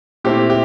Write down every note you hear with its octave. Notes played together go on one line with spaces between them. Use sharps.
A#2 A3 C4 E4 G4
G4